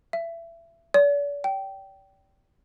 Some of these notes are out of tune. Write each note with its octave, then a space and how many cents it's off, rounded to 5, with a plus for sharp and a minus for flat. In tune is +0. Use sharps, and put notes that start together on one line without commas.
E5 +25
D5 -40
G5 -15